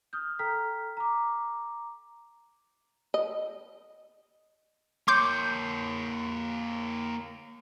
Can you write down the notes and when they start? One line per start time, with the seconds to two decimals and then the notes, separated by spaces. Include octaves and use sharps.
0.13 D#6 F6 G6
0.39 A4 G5 A#5 F6 B6
0.97 A#5 D6
3.14 D#5
5.08 A#3 C#5 C6 D6 G6